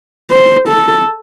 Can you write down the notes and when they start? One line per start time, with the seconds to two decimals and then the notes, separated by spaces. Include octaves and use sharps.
0.31 C5
0.68 A4